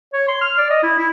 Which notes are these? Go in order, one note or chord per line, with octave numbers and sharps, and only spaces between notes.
C#5
C6
F6
D5
D#5
E4
E4